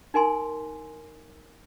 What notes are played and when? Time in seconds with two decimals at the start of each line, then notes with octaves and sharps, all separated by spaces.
0.14 D#4 A#4 G#5 C6